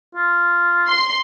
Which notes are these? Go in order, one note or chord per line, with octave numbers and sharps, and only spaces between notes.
F4
C6